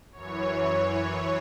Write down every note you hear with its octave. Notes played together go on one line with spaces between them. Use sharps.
F#2 E3 C#5